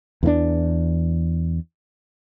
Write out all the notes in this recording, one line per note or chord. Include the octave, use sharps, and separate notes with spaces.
E2 E3 A#3 D4